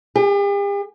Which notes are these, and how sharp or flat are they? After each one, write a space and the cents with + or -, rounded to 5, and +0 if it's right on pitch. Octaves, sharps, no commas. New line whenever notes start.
G4 +45